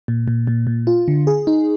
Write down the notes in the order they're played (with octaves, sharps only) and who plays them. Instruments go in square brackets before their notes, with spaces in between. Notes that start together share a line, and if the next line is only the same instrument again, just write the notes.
[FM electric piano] A#2
A#2
A#2
A#2
F4
D3
G#4
D#4